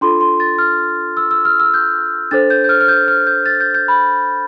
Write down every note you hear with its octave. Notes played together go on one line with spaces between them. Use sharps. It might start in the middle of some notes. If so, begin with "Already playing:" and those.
D4 F4 A4 C6
C6
A6
F6
E6
E6
F6
E6
G6
D4 A4 C5 A6
G6
G6
F6
F6
G6
F6
G6
A6
G6
G6
B5